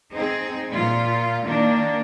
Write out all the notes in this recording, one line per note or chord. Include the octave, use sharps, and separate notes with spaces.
C4 D#4 G#4
A#2 F4
D#3 A#3 D4